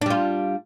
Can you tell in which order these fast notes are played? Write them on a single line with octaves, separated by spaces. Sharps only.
D4 G3 F4